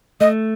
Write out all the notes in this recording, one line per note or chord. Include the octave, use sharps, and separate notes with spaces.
A3 D#5